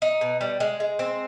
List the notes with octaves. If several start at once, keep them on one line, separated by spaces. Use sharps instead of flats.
D#4
B2
G3
G#3
G#3
C4